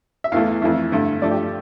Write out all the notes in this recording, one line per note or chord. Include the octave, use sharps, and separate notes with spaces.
E5
E2 E3 A3 F5
F2 E3 A3
G2 D3 A3
G2 F3 A3 D5
G4